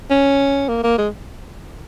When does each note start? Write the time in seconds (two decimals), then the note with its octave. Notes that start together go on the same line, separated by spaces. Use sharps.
0.10 C#4
0.69 A#3
0.83 A#3
0.98 G#3